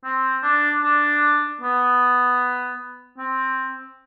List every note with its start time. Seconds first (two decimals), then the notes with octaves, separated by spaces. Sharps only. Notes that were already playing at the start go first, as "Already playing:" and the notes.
0.04 C4
0.43 D4
0.82 D4
1.61 B3
3.18 C4